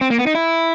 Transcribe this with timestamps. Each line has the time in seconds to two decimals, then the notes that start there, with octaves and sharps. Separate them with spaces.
0.01 C4
0.10 A#3
0.18 B3
0.27 D#4
0.35 E4